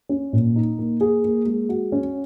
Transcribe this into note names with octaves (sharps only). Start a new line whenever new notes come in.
C#4
A#2
D#4
A#3
G#4
A#3
G#3
F#4
C#4